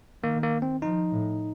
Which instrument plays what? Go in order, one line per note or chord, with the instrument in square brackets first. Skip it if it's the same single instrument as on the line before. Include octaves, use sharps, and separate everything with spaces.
[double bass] D#3 [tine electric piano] A#3
[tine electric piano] A#3
C4
[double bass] F3 [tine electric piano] D#4
[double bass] A2